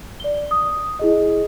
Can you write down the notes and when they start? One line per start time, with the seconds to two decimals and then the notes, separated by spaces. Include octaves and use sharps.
0.20 D5 G7
0.51 D#6
0.99 E4 G#4 D#5